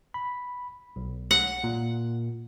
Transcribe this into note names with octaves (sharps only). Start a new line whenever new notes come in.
B5
B1
F#5
A#2